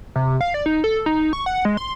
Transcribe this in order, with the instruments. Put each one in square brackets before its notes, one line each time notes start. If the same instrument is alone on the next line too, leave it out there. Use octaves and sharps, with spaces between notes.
[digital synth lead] C3
F5
D5
D#4
A4
D#4
C#6
F#5
G#3
C6